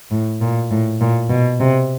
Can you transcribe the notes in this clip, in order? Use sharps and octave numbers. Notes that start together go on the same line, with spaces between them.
A2
A#2
A2
A#2
B2
C3